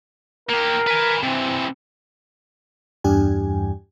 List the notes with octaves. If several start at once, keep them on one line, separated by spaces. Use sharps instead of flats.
A#3 G4 A#4
B4 G#5
C3 E3 C4
E2 G2 D4 G4 G#5